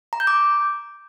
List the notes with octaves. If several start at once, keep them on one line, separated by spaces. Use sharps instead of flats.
A#5
G6
D6